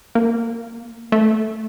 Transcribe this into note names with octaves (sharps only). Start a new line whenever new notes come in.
A#3
A3